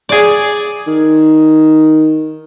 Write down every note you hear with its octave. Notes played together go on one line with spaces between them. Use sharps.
G#4 D5
D#3